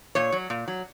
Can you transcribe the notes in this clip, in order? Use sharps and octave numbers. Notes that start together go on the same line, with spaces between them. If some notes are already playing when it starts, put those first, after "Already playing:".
A#2 C#5
F#3
A#2
F#3